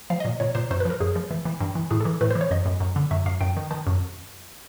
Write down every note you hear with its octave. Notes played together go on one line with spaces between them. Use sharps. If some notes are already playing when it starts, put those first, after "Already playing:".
F3 F5
D#5
A#2
A#2 C#5
A#2 C5
F#2 C5
B4
F3 A#4
F#2 G#4
F3
E3
E3
G2
E3
A2 G#4
A4
E3
A2 B4
C5
E3
C#5
F#2 D#5
F#2
F#2
D3
F#2 E5
F#2 F5
F#2 G5
D#3
D#3 A5
F#2